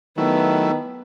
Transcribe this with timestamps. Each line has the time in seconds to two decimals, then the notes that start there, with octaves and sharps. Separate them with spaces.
0.18 D#3 F#3 A3 B3 E4